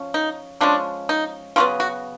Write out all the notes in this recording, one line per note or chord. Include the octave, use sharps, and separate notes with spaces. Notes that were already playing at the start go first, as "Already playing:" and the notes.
Already playing: F3 C#4
D#4
F3 G#3 C#4 D4
D#4
C#3 F#3 B3 F4
F#4